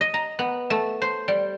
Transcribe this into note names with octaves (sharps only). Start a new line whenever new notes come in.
D#5
A#5
B3
A3
C5
G3